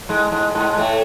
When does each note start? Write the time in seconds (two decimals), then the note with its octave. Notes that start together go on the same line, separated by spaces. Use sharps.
0.09 G#2 G#3
0.32 G#2 G#3
0.55 G#2 G#3
0.78 A2 A3